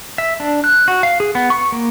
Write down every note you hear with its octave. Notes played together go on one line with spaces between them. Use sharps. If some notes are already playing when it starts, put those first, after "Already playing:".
E5
D4
F#6
F#4
F5
G#4
B3
C#6
A#3